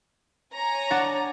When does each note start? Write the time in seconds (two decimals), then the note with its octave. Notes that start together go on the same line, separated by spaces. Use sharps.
0.54 C#5 G#5 A#5
0.90 D4 F#5 A6